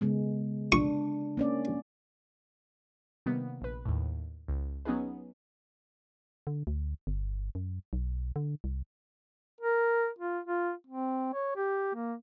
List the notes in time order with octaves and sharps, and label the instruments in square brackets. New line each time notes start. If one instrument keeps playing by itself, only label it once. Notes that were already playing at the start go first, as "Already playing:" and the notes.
[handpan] C#3 G#3 B3
[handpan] D4 [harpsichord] C#6
[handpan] A#3 C#4 D5
[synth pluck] C3 D#3 G3 A#3 B3
A#1 B4
D#2 A2
C#2
F#3 B3 C#4 D#4 G#4 B4
[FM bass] D3
D2
G1
F#2
B1
D3
C2
[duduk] A#4
F4
F4
C4
C#5
G4
A#3